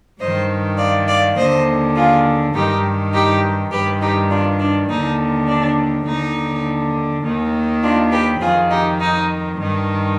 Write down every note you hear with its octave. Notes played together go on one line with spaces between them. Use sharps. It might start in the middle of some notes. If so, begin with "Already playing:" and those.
G2 D#3 C5 D#5
D5 F5
D5 F5
D#2 D3 C5 D#5
F4 G#4
G2 D#3 D#4 G4
D#4 G4
G2 D#3 G4 B4
D#4 G4
D4 F4
D4
D#2 D3 D#4
D4
D#2 D3 D#4
D#2 D#3
D4 F4
G4 B4
F2 D#3 F4 G#4
D#4 G4
D#4
G2 D#3